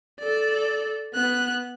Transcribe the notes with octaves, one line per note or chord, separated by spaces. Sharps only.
A4 D5
B3 F#6